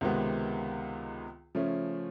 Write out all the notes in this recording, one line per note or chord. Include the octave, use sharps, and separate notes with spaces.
C#2 C3 D#3 G#3 B3
C#3 F3 A3 C#4